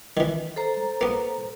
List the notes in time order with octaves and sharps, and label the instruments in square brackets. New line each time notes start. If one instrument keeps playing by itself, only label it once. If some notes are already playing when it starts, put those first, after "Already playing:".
[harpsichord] D#3 E3
[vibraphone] A4 C5 A#5
[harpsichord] A#3 B3